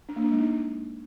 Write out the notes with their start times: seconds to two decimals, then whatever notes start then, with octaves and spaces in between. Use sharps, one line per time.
0.09 D4
0.16 A#3
0.24 D4
0.32 G#3
0.39 D#4